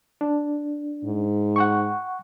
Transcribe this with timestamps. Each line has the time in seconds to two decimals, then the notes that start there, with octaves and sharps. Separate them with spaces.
0.21 D4
1.05 G#2
1.56 F#5 G5 C#6